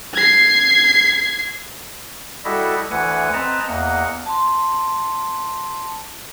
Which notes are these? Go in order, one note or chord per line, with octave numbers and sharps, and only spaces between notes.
G#6 C7
G3 E4 F#4 A4 D#5 E5
D2 E3 F#5 G#5
C4 B4 D#5 A5 A#5
E2 A#3 D#5 F#5
A5 C6